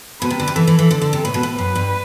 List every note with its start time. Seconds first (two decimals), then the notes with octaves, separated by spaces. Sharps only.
0.22 B2 B4
0.30 C3
0.40 D3
0.48 C3
0.56 E3 A4
0.67 E3
0.79 E3
0.91 D3
1.02 D3
1.13 C3
1.24 A2 B4
1.34 B2
1.43 A2
1.58 F#2 B4
1.75 G2